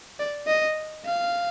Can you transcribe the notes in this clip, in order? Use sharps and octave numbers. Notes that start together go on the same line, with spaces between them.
D5
D#5
F5